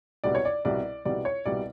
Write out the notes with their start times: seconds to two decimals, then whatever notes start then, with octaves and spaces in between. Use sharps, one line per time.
0.24 C2 B2 G3 D5
0.35 C#5
0.45 D5
0.65 C2 B2 G3 D5
1.05 C2 B2 G3 D5
1.25 C#5
1.46 C2 B2 G3 D5